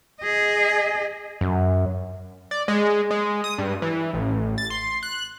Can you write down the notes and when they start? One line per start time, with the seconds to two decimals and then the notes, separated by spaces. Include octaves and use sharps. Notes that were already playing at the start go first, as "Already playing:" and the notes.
0.21 G#4 D#5
1.41 F#2
2.51 D5
2.68 G#3
3.11 G#3
3.44 D#6
3.58 G2
3.82 E3
4.13 A1
4.58 A6
4.70 C6
5.03 F#6